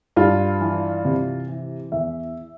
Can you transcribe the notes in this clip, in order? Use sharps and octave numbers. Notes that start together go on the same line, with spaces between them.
G2 F4
E3
C3
E3
E2 E5